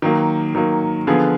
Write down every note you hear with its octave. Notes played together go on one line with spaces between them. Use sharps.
D#3 F#3 A#3
D#3 F#3 A#3
D3 F3 B3 F4 G#4